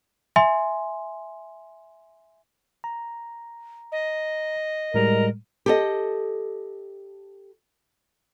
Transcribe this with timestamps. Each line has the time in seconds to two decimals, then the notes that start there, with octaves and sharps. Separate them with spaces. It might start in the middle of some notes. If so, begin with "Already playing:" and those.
0.36 E5 G#5 C6
2.84 A#5
3.92 D#5
4.94 A2 G3 G#3 A#4
5.66 G4 A4 D#5